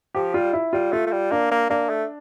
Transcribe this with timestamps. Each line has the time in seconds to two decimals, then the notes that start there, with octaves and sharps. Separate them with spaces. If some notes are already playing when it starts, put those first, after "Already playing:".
0.15 F3 G4
0.34 G3 F4
0.53 E4
0.73 G3 F4
0.92 A3 F4
1.06 A3
1.12 G3
1.31 A#3 D4
1.51 A#3
1.70 A#3 D4
1.90 A3